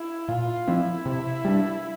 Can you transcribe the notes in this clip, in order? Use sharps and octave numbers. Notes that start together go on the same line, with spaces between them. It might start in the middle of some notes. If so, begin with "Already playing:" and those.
Already playing: E4
A#2 F4
F3 C4 E4
C3
G3 D4